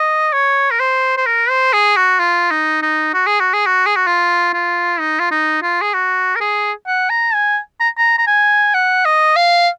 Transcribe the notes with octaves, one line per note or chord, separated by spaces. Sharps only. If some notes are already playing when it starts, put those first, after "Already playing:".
Already playing: D#5
C#5
A#4
C5
C5
A#4
C5
G#4
F#4
F4
D#4
D#4
F#4
G#4
F#4
G#4
F#4
G#4
F#4
F4
F4
D#4
F4
D#4
F4
G#4
F#4
A#4
G#4
F#5
A#5
G#5
A#5
A#5
A#5
G#5
F#5
D#5
F5